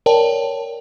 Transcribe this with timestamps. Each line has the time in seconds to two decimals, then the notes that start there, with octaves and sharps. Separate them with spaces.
0.06 A#4 C#5 D5 G5 A5